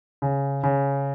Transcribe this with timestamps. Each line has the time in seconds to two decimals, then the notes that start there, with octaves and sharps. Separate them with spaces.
0.22 C#3
0.63 C#3